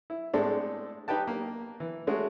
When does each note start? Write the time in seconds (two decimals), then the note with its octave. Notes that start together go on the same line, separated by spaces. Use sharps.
0.10 E4
0.34 A2 G#3 C4 D4 A4
1.08 D#4 G4 B4 G5 A5
1.27 A#3
1.80 E3
2.07 G#3 A3 C#4 F#4